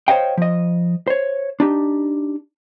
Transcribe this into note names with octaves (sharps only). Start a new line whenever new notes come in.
C5 C#5 D#5 F5 G5
F3 D#5
C5 C#5
D4 D#4 G4